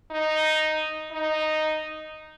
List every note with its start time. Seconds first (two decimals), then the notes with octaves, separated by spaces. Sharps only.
0.11 D#4
1.12 D#4